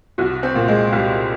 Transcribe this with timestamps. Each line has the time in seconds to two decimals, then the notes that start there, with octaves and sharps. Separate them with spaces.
0.18 C2 F#4
0.43 C4
0.55 A#2
0.68 G#3
0.92 C2 G3